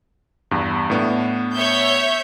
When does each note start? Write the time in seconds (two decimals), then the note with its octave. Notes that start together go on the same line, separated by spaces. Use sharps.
0.51 E2 G2
0.90 A2 B3 D4
1.55 C#5 E5 G6